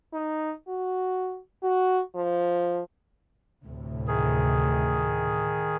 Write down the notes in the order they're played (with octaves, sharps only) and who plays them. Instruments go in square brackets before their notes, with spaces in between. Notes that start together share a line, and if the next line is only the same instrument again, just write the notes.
[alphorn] D#4
F#4
F#4
F3
[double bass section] D2 A2 C3
[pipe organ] D#3 G#4